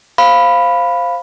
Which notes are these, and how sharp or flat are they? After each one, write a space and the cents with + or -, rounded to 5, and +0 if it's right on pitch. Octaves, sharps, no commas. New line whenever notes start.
C5 +5 F5 +0 B5 +5